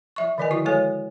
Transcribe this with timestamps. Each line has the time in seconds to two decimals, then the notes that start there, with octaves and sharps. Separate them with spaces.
0.16 F3 E5 C#6
0.38 D3 D#3 F3 A#4 D#5 G#5
0.51 E4 F#4 C#6
0.65 G#3 F#4 A4 C#5 G#5